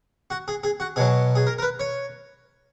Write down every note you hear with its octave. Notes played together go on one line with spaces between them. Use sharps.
F#4
G#4
G#4
F#4
B2 F#3 G#4
G#4
A#4
A#4
B4
C#5